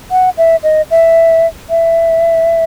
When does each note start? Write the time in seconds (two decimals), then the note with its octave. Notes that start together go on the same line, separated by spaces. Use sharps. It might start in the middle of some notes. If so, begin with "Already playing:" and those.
0.11 F#5
0.38 E5
0.63 D#5
0.91 E5
1.70 E5